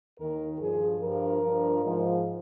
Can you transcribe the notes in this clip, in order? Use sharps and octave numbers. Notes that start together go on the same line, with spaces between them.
D#2 D#3 A#4
G2 F3 G#4
G2 F3 A#4
G2 F3
G#2 F3